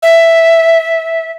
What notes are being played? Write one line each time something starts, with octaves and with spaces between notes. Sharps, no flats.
E5